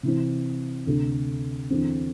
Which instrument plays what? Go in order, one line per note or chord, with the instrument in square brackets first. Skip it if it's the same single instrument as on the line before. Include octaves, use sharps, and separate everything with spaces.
[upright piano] C3 E3 C4
D2 C3 A3
E2 D3 C4